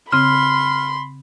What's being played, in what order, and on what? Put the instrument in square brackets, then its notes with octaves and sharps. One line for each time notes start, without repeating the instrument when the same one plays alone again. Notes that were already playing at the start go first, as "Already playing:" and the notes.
[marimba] C#3 C4 [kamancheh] B5 [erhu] C6 [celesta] F6